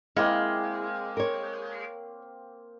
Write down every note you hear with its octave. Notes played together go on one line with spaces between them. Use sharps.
G#3 A#3 C4 E4 F5
A#4 C#5